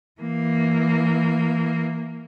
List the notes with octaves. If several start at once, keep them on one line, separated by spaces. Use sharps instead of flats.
E3 A#3